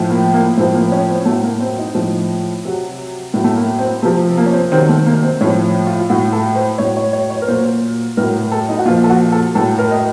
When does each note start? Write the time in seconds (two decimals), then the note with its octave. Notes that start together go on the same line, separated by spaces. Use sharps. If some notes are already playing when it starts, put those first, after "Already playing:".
Already playing: A2 F3
0.10 A#3
0.34 A#3
0.57 A2 F3 C4
0.75 A#3
0.92 C#4
1.09 C4
1.25 A2 F#3 A3
1.44 A#3
1.60 C4
1.78 D#4
1.95 A2 F3
2.65 C3 F#3
3.34 A2 F#3
3.44 A3
3.56 A#3
3.79 C4
4.02 C3 F3 A3
4.37 A#3
4.46 C#4
4.54 C4
4.72 C3 D#3 F#3 C4
4.89 A3
5.06 A#3
5.23 C4
5.41 A2 F3 C#4
5.87 F4
5.99 F4
6.10 A2 F#3 F#4
6.33 A4
6.55 C5
6.78 A2 F#3 C#5
6.97 C#5
7.13 C#5
7.30 C#5
7.42 A#4
7.48 A#2 F#3 C5
8.17 A2 F#3 A#4
8.52 A4
8.69 D#4
8.79 F#4
8.85 A#2 F4
8.89 F3
9.04 A4
9.10 F#4
9.32 A4
9.55 A2 F#3 A4
9.79 A#4
9.91 D#5